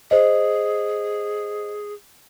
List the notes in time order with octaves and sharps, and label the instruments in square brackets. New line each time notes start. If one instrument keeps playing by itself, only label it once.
[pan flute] G#4 [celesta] C5 D#5